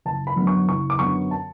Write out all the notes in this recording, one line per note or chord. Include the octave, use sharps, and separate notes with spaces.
F#1 A5
B5
F#2 D3 F#3 B3
C#6
F#1 C#6
D6
F#2 D3 F#3 B3 C#6
A5